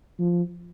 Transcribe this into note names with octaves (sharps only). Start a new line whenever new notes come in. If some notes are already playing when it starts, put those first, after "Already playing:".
F3